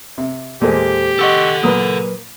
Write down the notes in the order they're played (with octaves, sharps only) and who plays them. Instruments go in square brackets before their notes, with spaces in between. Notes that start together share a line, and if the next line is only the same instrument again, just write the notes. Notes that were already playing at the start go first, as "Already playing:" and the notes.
[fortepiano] C3
[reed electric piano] E2 A4 C5 [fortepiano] A#2 G#3 [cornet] G4
[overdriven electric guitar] A4 F#5 [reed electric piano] D#5 C#6 E6
[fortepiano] A#2 D#6 [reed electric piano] F#3 A#4 B4